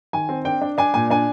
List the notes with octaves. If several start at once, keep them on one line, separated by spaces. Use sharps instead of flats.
D#3 G#5
C4
D4 G5
D4
D4 G#5
A#2 G#5
D4 G#5